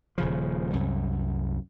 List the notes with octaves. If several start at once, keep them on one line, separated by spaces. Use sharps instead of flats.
D#1 C#3 F3
C2 F#2